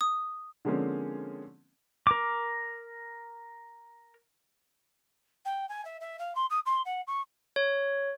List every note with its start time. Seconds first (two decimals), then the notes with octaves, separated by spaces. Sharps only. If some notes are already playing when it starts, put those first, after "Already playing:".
0.01 D#6
0.65 D3 F3 G#3 A#3 C4 C#4
2.07 A#4 D6
5.45 G5
5.69 G#5
5.85 E5
6.00 E5
6.19 F5
6.35 C6
6.50 D#6
6.65 C6
6.85 F#5
7.07 C#6
7.56 C#5